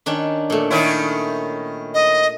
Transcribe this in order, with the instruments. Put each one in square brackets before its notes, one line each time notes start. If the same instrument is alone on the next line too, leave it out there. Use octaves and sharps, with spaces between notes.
[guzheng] D#3 C#4 D4
A#2 A3
[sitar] D#3 C#4 E4
[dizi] D#5